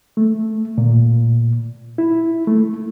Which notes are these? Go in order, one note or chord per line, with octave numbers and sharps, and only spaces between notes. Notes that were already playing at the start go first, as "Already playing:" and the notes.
A3
A#2
E4
A3